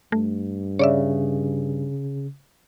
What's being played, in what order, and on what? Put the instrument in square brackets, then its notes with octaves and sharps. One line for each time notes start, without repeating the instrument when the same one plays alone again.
[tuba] G2 [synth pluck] A3
[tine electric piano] C#3 [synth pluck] C#5 D5 E5